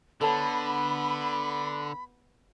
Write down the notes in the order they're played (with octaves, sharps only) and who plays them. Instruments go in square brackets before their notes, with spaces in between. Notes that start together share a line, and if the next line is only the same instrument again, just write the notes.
[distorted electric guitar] D3 [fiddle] B3 [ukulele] A4 C#5 A5 [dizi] B5